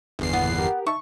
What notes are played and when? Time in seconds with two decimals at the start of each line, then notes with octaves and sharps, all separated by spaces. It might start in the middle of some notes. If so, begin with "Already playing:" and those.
0.19 G1 E2 C7
0.33 C#2 A#2 E3 B3
0.58 G4 A#4
0.87 D#4 E5 A5 C#6